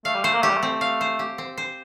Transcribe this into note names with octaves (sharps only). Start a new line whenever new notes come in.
A3 F5
G3
A3 C5
A#3
A3 G4
G3
A3
C4
F5
C5
G4
C4
C5